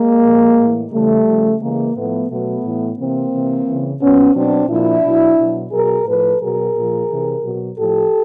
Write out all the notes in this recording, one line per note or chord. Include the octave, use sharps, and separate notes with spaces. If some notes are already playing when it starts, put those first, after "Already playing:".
Already playing: G#3 A#3
A#2 F3
A2 E3
C#3 E3 G3 A3
C#3 F3
C#3 E3 G#3 A#3
A2 F3 A3 B3
B2 F#3 A3 B3
A2 E3
C3 E3 A#3 C4
C3 E3
C#3 E3
A#2 F#3 B3 C#4
B2 F#3 C4 D4
A#2 F3 D4 E4
B2 F#3
B2 F#3
B2 F#3 G#4 A#4
A2 F3 A4 B4
B2 F#3 G#4 A#4
A#2 F3
C3 E3
B2 F#3
A2 F3 G4 A4